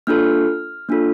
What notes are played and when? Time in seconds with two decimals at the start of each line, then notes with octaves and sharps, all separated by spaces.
0.07 A#3 D4 F4 A4 F6
0.89 A#3 D4 F4 A4